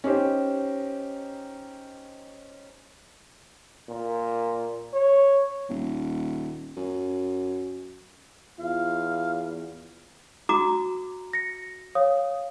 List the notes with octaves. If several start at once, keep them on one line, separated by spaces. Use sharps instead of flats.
C#4 D#4 G4 C5
A#2
C#5
D#1
F#2
E2 F4 F5
F#4 A#5 D6
A#6 C#7
C#5 F5 D#6